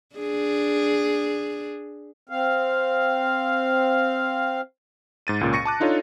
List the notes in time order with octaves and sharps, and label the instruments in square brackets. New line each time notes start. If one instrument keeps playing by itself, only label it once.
[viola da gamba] D4 G#4
[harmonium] C4 F5
[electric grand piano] G#2 A6 D#7
C#2 A#2 C#4
C#6 A#6 C#7 D#7
A5 D6 F#6
D4 D#4 F4 A4 C#5